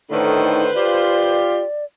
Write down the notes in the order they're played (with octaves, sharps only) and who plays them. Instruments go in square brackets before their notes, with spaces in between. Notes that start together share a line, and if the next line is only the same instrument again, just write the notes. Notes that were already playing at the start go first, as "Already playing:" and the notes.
[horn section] A2 D3 D#3 [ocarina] D#4 [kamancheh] B4 C5
[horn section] F4 G4 [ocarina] D5